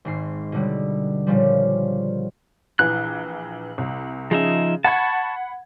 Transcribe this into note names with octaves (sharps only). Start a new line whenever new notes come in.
G#1 G#2 C7
B2 D3 G3
A#2 C#3 F3 G3
A#1 E3 F#6
C2
C#3 F3 D#4 G#4 E5
F#5 A5 B5 C#6 G#6